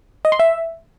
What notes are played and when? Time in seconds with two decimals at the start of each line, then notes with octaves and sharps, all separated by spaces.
0.25 D#5
0.32 C6
0.39 E5